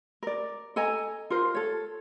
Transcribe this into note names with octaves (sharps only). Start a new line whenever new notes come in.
A#4 D5
A4 D#5 G#5 A#5
F4 A#4 C5
A4 C#5